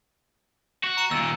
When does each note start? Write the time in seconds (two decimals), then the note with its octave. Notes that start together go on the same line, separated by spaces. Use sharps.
0.84 F#4
0.97 A#5 C#7 E7
1.11 D#2 A#2 E6